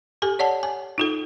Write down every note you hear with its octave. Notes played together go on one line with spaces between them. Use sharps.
G4 A4 G#5
C#5 D5 F#5 A5
G#5
D#4 F4 A4